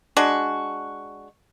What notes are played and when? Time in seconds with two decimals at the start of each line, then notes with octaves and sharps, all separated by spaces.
0.17 G#3 D4 F#4